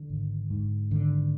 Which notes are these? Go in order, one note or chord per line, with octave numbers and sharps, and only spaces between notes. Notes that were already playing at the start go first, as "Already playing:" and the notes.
Already playing: D3
G#1
G#2
G#1 D3